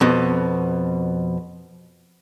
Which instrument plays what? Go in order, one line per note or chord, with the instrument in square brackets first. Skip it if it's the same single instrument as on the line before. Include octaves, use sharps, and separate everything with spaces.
[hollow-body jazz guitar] F2 B2